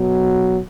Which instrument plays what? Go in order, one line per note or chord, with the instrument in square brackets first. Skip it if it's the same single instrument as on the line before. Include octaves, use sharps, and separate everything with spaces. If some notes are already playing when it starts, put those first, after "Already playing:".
Already playing: [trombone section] B2 F#3